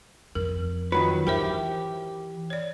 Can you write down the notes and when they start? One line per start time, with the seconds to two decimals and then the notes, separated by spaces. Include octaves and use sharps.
0.35 F2 A#4
0.92 D#3 F#3 F4 B4
1.27 E3 G4 A#4 C5 E5
2.50 C#5 D5